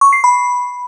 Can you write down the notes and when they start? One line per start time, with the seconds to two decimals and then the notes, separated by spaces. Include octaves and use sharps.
0.01 C#6
0.13 C7
0.24 B5